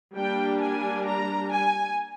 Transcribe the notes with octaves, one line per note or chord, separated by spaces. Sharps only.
G3 A#3 D4 G5
G#5
A#5
G#5